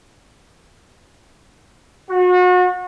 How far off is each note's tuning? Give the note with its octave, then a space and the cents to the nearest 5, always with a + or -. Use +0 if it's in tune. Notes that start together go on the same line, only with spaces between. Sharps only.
F#4 -35